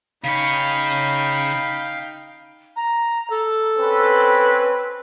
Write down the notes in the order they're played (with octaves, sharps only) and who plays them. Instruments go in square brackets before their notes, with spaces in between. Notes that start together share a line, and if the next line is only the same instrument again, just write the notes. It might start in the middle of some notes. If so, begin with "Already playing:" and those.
[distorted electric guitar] C#3 C#5 [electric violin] D#4 G5 [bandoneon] F5 [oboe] B5
[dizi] A#5
A4
[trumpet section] C4 C#4 B4